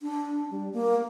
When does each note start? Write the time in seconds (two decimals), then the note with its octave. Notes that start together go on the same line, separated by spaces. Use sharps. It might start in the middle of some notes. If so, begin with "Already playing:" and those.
0.01 D4
0.51 G3
0.73 A#3